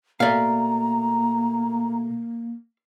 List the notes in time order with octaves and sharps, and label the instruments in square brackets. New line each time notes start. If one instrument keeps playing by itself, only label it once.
[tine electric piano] B2 A3 [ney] A#3 [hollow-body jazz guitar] D5 F5 [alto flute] A#5